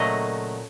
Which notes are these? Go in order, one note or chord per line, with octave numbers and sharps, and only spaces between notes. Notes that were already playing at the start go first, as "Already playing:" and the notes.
Already playing: A#2 C#3 F#3 A3 D#5